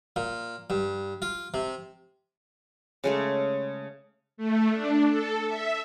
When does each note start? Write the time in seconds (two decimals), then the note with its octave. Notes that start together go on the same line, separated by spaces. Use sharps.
0.16 A#2
0.70 G2
1.22 F4
1.54 C3
3.04 C#3 G#3 A3
4.37 A3
4.71 D4
5.08 A4
5.48 E5